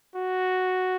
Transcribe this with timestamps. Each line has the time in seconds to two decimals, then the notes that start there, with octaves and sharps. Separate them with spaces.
0.15 F#4